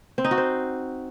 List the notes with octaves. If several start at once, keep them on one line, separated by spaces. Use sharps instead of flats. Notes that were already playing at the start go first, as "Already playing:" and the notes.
C4
D#4
F#4
C5